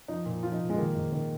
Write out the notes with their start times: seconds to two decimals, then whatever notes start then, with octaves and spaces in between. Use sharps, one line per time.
0.08 F3 D#4
0.26 A#2
0.43 F3 F4
0.52 D#4
0.60 A#2
0.70 G#3
0.78 D#3 A#3
0.95 G#2
1.13 D#3